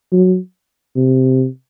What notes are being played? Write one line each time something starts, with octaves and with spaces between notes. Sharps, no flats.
F#3
C3